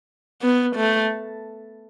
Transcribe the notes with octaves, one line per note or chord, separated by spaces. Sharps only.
B3
A3